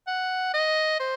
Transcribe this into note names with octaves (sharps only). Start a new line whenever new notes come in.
F#5
D#5
C5